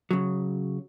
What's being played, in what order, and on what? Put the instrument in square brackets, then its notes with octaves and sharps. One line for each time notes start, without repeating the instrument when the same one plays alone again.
[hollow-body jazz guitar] C#3 F#3